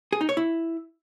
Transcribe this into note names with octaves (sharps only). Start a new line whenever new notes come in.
G#4
D#4
C#5
E4